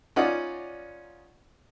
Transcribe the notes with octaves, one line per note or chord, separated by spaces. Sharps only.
C#4 D#4 F4 D5 D#5 F#5